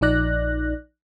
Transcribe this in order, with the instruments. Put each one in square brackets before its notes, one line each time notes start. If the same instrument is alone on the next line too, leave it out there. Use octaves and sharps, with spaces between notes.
[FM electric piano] A#1 F3 D#4 D5 F#6 A#6